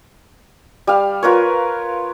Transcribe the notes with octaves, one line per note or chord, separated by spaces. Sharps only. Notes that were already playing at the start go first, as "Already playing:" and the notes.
G3 F5
F4 A#4 B4 C#5